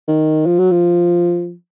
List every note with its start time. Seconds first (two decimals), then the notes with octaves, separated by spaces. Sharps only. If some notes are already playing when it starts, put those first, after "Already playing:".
0.08 D#3
0.46 F3
0.59 F#3
0.72 F3